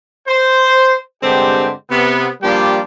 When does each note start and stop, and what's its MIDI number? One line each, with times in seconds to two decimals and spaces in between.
0.27 0.94 72
1.22 1.69 43
1.22 1.69 50
1.22 1.69 56
1.22 1.69 60
1.22 1.69 67
1.90 2.27 48
1.90 2.27 59
2.43 2.80 53
2.43 2.80 55
2.43 2.80 58
2.43 2.80 62
2.43 2.80 65
2.43 2.80 67